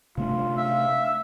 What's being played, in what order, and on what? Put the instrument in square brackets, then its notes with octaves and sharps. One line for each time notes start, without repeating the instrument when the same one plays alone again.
[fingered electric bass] C3 A3 D4 [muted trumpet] F4
[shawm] E5 [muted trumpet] F5